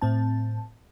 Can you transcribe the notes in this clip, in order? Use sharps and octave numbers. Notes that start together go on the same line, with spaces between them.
A2 C4 A5